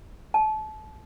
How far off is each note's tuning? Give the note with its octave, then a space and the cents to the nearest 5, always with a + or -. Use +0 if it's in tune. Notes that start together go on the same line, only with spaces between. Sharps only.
A5 -30